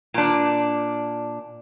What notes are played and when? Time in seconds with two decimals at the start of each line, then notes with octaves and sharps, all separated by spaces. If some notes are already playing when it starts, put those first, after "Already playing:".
0.14 A#2 D4